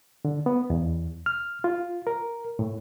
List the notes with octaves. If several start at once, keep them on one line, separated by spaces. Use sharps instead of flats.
D3
B3
E2
F6
F4
A#4
A2